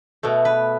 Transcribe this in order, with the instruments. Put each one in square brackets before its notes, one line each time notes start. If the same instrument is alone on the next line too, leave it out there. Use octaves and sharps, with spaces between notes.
[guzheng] B2 A3
B4